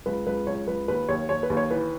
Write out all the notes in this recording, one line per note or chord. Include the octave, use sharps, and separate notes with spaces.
C#2 B4
C#2 B4
C#2 C#5
C#2 B4
D#2 B4
D#2 C#5
D#2 C#5
B4
D#2
C#5
E3 B4